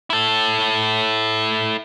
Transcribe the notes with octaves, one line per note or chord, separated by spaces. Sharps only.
E4 A4